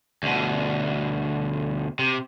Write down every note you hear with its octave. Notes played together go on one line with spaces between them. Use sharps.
D2 B2
C3